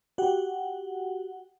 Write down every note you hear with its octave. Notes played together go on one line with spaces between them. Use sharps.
F#4 G4 F#5